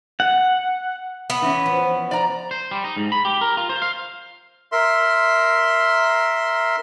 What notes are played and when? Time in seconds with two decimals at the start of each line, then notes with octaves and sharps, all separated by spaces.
0.20 F#5
1.30 B3
1.42 E3 C#4
1.66 F3
2.11 D5 A#5
2.51 C5
2.71 G3
2.84 D#4
2.97 G#2
3.12 B5
3.25 G4
3.41 A#4
3.57 F4
3.69 C5
3.82 F5
4.72 A#4 E5 C6